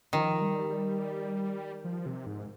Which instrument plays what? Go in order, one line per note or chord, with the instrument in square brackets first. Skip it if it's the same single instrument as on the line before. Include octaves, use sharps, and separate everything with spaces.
[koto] D#3 [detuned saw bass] F3
[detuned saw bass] G3
G3
F3
C3
G#2